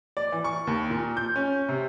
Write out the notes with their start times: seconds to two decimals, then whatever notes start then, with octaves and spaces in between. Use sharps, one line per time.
0.17 D5
0.32 E3
0.44 C#6
0.67 D#2
0.90 A#2
1.17 G6
1.36 C#4
1.69 C3